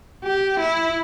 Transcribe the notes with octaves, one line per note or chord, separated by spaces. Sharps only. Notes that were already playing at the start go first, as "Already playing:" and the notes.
G4
E4